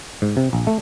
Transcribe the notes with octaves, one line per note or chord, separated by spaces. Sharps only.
G#2
C3
A#1
A3